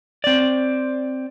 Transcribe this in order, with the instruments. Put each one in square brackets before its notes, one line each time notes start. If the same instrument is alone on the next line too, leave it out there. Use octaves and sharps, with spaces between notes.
[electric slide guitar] C4 D5